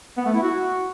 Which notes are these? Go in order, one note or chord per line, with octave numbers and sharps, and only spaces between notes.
B3
A3
E4
F#4